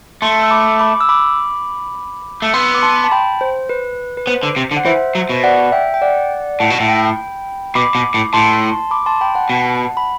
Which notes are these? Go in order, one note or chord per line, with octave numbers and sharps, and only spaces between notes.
A3 A5 C6
E6
B5 D6
B5 D6
E6
B5 D6
A3
B3 C6 E6
D6
A5 C6
A5
G5 B5
C5
B4
B4
B3 C5
D3
C3
D3
F#5
E3 C5 E5
F#3
B2
D5 F#5
E5 G5
G5
D5 F#5
A2 F#5 A5
B2
A2
G5 B5
B2 B5 D6
B2
A2
A2 A5 C6
B5 D6
A5 C6
G5 B5
F#5 A5
B2
B5